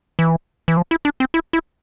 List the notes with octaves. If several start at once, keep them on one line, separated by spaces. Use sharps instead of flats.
E3
E3
F3
E4
D4
C4
E4
E4